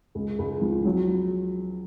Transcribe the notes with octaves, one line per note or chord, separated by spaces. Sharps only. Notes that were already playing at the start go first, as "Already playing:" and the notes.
C#2
C#2
F3
F#3